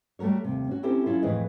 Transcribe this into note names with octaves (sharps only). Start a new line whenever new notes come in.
G3 A3 F#4 A#4 C#5
D#2 C3
C#4 F#4
C4 C#4 E4 G4 A4 C5
F#3 C#4 E4 F4
F2 A2 E3 G#4 B4 D#5